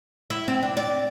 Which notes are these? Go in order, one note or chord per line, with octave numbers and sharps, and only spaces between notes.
E4
C4
D4
D5